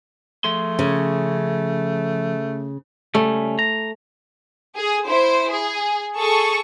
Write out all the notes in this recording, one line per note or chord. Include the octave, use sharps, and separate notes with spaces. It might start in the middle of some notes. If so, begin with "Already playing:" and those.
F3 A3 G#4 C6
C#3 C#4
C#3 G3 A3 C#4
A#5
G#4
E4 C5
G#4
G#4 A4 C#6